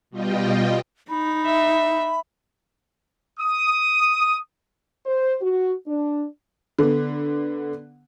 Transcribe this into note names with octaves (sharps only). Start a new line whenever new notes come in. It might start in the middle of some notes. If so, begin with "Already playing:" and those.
B2 G3 F4 D#5 G5
D#4 B5
E5
D#6
C5
F#4
D4
D3 B3